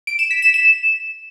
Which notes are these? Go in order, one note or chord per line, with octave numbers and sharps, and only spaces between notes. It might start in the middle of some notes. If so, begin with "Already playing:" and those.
D7
E7
B6
E7
E7